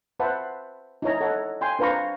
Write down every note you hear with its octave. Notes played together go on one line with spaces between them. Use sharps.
B4 C5 E5 F#5 A5 B5
D#4 E4 C#5 A#5
A4 C#5 F#5
G5 G#5 C6
D4 B4 C5 F5 A#5 C#6